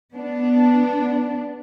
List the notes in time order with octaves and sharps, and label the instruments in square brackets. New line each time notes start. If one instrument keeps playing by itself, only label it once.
[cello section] B3 D4